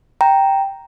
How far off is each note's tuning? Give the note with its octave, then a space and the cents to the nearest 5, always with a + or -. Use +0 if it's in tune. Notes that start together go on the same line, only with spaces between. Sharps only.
G5 +0 A#5 +0